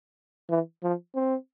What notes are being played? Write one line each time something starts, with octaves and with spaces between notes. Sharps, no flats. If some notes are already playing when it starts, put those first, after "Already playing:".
E3
F3
C4